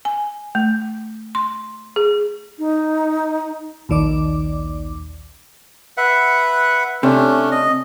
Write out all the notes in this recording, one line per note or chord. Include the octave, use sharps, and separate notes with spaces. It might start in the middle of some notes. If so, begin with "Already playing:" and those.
G#5
A3
C6
G#4
D#4
A#1 D#2 D#3 D5 D6
B4 E5 F#5
C3 A3 C#4 D4
D#5